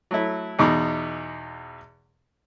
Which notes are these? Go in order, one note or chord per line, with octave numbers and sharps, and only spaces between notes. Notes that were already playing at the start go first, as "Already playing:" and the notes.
F#3 A3 E4
E2 B2 D#4 D6